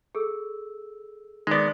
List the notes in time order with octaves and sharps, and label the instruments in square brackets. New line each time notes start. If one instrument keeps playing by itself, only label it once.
[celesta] G#4 A4 E6
[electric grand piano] D#3 D5 [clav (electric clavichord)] G#3 B3